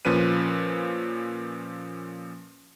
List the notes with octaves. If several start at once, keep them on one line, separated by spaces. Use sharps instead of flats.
A#2 F3 C#4 B4 D#7